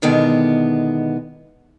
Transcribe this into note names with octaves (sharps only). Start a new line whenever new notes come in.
B2 D3 D#3 G#3 B3 E4